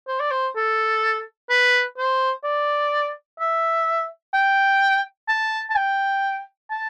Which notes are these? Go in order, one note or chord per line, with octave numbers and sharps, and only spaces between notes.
C5
D5
C5
A4
B4
C5
D5
E5
G5
A5
A5
G5
A5